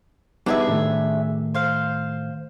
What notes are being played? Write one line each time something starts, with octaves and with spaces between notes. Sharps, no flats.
G3 B3 D4 D#4 G#4 E5
A2 D#3 A3
C5 F5